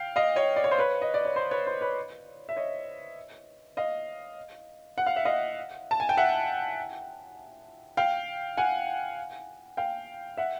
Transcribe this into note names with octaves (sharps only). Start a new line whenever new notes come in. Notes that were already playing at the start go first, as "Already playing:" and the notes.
Already playing: F5 G5
D#5 F5
C#5 D#5
D5
C#5
C5
B4 C#5
D#5
D5
C#5
C5
B4 C#5
C5
B4 C#5
E5
C#5 D#5
D#5 F5
F#5
F5
E5
D#5 F5
A5
G#5
G5
E5 F#5
F5 G5
F#5 G#5
F5 G5
E5 F#5